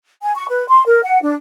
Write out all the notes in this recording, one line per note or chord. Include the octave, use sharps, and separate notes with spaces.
G#5
C#6
B4
C6
A#4
F#5
D4